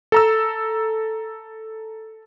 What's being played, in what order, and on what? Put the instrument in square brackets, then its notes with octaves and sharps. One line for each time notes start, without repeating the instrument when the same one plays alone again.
[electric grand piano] A4 A#5 E6